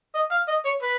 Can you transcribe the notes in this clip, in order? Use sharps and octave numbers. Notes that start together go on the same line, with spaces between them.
D#5
F5
D#5
C#5
B4